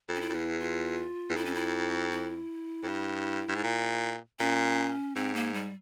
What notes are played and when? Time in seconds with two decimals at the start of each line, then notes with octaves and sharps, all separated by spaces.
0.09 F2
0.15 C#4
0.21 E4
0.29 F2
0.34 E2
0.59 F4
1.29 E2
1.36 F2 E4
1.45 C#4
1.55 E4
2.12 E4
2.83 F2
2.88 G2
3.48 G2
3.55 G#2
3.64 A#2
4.39 A#2 C#4
5.16 G#2 C4
5.35 A#3
5.54 G3